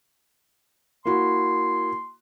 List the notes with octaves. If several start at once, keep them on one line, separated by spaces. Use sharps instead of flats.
A#3 E4 F#4 C6